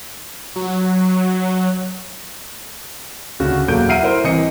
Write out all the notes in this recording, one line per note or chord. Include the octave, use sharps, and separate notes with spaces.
F#3
D2 C#3 F#4
E1 F#3 A3 A#3 G6 D7
E5 F#5 F6 C7 D7 D#7
E4 A#4 C5
C2 E3 D#5 C#7